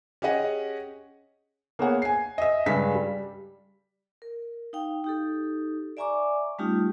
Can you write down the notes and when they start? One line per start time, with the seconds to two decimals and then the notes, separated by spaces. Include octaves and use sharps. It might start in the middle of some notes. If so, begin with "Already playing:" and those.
0.22 C#4 G4 G#4 D#5 F#5
1.79 A#3 B3 G#4 C#5 F#5
2.02 G#5 C7
2.38 D#5 E5
2.66 G2 C#3 G#3 G4 B6
2.95 G3
4.22 A#4
4.73 D#4 F5 G5
5.04 D#4 G4 A4
5.97 D5 E5 G#5 A#5 C#6 D6
6.59 G3 A3 C#4 D#4 F4 G4